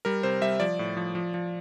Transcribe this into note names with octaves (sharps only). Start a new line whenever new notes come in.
G3 A#4
C3 C5
G3 E5
F3 D5
A2
F3
F3
F3